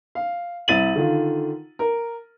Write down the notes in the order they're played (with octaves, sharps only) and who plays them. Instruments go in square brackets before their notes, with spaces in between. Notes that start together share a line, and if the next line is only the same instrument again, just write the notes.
[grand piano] F5
C2 E5 A6 D#7 F#7
D3 D#3 F4
A#4